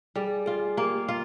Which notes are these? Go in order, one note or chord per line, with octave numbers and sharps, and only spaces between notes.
G3 G#4
F4 G#4
A#3 G4
F4